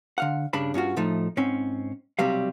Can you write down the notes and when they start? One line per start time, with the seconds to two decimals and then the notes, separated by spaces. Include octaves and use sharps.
0.18 D3 F5 F#5
0.53 G2 C#3 D4 B5
0.74 G2 C#4 F4 F#4
0.96 A2 F3 A3 D#4
1.37 G#2 C4 C#4
2.19 B1 C3 F#3 G3 F5